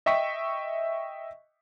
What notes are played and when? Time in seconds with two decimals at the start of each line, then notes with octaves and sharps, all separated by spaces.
0.06 D#5 E5 G5 C#6 B6